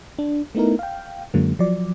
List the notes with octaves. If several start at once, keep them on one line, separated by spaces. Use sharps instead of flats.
D4
A3 B3 D#4 E4 A#4
F5 G5
F#2 D3 F#3 G#3 A#3
F3 F#3 D5